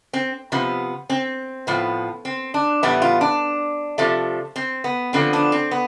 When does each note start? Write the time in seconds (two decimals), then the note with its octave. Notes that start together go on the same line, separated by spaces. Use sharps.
0.13 C4
0.52 C3 F3 B3
1.10 C4
1.67 A2 F3 B3
2.25 C4
2.54 D4
2.83 A2 E3 G3 B3 E4
3.02 F4
3.21 D4
3.98 C3 F3 A3
4.56 C4
4.84 B3
5.13 D3 F3 B3 C4
5.33 D4
5.52 C4
5.71 B3